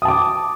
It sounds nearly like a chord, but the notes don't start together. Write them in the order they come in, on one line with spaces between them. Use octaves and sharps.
D#6 A5 D6